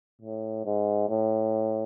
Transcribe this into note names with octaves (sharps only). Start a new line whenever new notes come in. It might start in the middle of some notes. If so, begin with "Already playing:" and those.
A2
G#2
A2